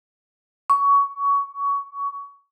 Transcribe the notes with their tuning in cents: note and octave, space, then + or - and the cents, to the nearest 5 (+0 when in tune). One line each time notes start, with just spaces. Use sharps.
C#6 +20